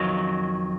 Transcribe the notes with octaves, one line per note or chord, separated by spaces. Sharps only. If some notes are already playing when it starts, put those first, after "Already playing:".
Already playing: F2 D#3 F#3